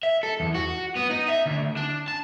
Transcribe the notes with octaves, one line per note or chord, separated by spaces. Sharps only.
E5
A4
E2
F#4
B3
D#4
E5
D2
D4
A5